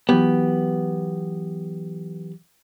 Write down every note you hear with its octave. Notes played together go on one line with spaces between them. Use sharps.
E3 F#3 B3 G4